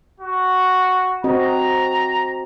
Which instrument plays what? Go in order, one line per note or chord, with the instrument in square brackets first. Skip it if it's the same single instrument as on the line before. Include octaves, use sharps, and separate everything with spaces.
[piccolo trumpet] F#4
[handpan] C4 F#4 D#5 [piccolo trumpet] A#5